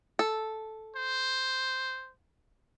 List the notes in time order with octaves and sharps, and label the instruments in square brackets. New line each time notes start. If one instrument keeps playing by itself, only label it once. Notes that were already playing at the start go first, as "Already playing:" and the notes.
[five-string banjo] A4
[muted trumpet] C5